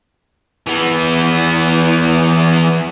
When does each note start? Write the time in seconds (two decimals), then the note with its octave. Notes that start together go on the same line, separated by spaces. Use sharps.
0.67 E3 B3